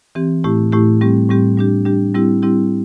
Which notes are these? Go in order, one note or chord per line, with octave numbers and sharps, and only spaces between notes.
E3 C4 G4
A2 A3 E4 G4
A2 A3 E4 G4
A2 G3 C4 G4
A2 G3 C4 G4
G3 D4 G4
G3 D4 G4
G3 C4 E4 G4
G3 C4 E4 G4